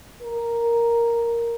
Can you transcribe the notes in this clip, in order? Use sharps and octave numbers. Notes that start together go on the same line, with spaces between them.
A#4